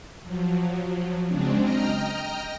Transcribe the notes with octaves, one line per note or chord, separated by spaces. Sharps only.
F3 F#3
C#3 F#3 G#3 C4 D4
D#5 G5 A#5 F6